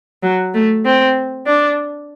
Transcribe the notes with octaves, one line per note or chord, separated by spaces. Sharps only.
F#3
A3
C4
D4